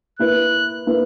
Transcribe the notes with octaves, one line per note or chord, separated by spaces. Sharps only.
A#3 E4 B4 F#6
A#3 E4 B4